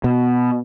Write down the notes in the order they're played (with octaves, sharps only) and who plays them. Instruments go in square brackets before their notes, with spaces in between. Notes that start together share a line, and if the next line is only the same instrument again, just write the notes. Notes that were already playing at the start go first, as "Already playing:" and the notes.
[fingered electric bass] B2